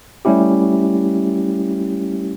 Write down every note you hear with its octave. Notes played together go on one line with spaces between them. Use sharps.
G3 A3 C#4 E4 G4